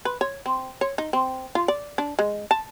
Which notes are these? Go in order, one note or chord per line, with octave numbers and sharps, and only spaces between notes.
B4
C#5
C4
C#5
D#4
C4
F4
D5
D4
G#3
A5